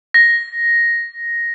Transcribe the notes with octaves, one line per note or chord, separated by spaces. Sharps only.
A#6